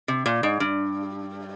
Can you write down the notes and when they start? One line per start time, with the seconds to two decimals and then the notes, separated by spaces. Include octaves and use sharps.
0.08 C3
0.26 A#2
0.43 G#2
0.60 G2